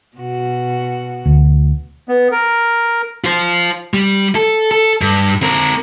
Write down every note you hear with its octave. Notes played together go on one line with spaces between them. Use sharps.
B2 F#4
D2
B3
A#4
F4 C5
G3
A4
A4
G2
C4 A#4